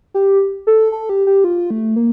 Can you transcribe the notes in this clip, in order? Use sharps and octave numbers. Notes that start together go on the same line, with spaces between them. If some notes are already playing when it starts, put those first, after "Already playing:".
G4
A4
A4
G4
G4
F4
A3
A#3